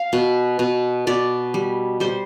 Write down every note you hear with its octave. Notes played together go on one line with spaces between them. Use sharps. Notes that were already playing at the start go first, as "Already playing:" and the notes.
Already playing: F5
B2
B2
B2 D5
G3
G3 C5